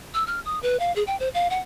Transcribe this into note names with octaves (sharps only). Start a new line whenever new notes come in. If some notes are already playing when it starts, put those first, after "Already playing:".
E6
F6
D#6
B4
F5
G#4
G5
C5
F5
F#5